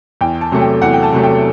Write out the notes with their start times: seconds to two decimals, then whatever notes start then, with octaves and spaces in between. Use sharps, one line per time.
0.21 E2 G5
0.41 A5
0.52 C3 F#3 A3
0.61 G5
0.82 E2 F#5
0.93 G5
1.03 A5
1.13 C3 F#3 A3
1.23 G5